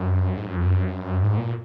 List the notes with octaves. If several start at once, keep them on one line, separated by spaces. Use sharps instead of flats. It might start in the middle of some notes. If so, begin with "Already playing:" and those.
Already playing: F#2
G#2
F#2
F2
F#2
G#2
A#2